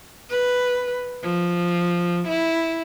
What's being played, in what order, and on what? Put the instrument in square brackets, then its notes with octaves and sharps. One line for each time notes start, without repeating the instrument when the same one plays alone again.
[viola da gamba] B4
F3
E4